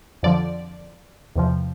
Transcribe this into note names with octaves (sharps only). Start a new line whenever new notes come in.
F2 D3 F3 D5
E2 C3 F3